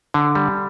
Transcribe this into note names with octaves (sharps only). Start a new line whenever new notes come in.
D3
G3